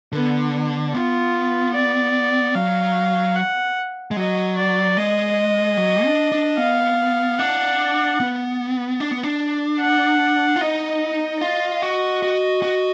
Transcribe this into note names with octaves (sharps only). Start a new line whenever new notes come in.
D3 B3
B3 F4
D5
F#3 F5
F#5
G#3
F#3 D#5
D5
G#3 D#5
F#3
D4
D4
B3 F5
D4 F#5
B3
D4
B3
D4
F#5
F4
D#4 D#5
F4 D#5
F#4
F#4
F#4